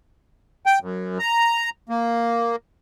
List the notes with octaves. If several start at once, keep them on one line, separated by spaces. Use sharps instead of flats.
G5
F#2
A#5
A#3